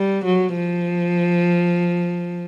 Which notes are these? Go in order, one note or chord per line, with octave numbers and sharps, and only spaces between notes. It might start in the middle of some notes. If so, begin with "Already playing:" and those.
Already playing: G3
F#3
F3